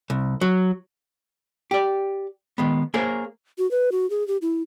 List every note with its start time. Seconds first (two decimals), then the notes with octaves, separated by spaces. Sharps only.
0.10 C2
0.41 F#3
1.71 G4 D5
2.58 D#3 G#3 B3
2.94 A#3 G#4 A#4 C5 C#5
3.58 F#4
3.71 B4
3.92 F#4
4.10 G#4
4.28 G4
4.42 E4